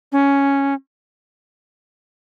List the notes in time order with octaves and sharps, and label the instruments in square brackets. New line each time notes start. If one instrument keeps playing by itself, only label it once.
[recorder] C#4